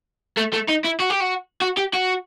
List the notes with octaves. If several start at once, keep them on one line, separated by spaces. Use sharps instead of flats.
A3
A3
D#4
E4
F#4
G4
F#4
F#4
G4
F#4